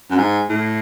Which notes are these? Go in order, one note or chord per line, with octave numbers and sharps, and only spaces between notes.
F#2
G#2
A2